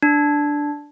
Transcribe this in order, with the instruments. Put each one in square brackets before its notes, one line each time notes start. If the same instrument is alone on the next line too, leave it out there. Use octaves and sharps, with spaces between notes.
[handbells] D4